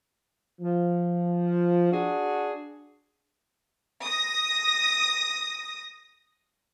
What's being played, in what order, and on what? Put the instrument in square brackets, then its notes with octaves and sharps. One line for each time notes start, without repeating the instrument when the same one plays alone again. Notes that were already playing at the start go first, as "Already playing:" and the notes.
[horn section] F3
D4 F#4 G#4
[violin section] D#6 A#6